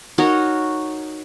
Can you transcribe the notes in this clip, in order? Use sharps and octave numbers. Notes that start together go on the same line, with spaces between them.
D#4 F#4 A#4 C#5